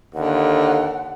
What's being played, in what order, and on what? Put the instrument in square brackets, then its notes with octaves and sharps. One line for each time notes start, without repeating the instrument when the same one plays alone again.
[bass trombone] D#2 [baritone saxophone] D3 [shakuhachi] F#5